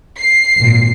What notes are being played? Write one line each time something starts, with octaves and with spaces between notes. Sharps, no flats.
C7
G#1 A#2